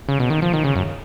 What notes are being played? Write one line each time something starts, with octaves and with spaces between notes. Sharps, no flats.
C#3
B2
D#3
F3
D#3
C#3
F#2